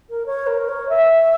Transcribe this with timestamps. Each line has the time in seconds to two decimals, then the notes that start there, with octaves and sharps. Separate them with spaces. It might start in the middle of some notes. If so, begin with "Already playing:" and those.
0.10 A#4
0.26 C#5
0.47 A#4
0.69 C#5
0.89 E5